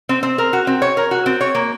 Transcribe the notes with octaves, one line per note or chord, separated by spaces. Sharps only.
C4
C4
A#4
F#4
C4
C#5
A#4
F#4
C4
C#5
A#3